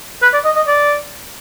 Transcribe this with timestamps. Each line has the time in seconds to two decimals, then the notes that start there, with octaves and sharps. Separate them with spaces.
0.22 B4
0.34 D5
0.45 D#5
0.56 D#5
0.67 D5